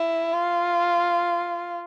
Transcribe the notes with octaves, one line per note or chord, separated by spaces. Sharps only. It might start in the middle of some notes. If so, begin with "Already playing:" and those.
Already playing: E4
F4